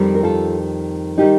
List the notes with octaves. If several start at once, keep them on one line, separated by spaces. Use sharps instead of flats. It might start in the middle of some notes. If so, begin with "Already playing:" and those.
Already playing: F2 D#3 G3
A#4
F4 A4
D#3 G3 D#4 G4